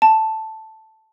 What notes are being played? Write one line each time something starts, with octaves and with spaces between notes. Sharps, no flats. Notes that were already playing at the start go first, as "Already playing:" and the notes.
A5